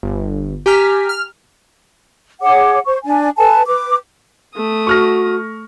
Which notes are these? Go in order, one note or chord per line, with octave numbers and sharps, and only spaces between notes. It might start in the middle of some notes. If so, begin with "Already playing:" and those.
G1
G4 G#5 A#5 F6 B6
F6
G#4 C#5 F#5 D6
C5 C#6
D4 D5 G#5
A4 B4 G#5 A5
B4 D6
A3 D#6
F#4 C#6 F6 A#6